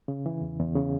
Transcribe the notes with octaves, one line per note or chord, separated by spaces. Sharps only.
C#3
E3
E2
E2
C#3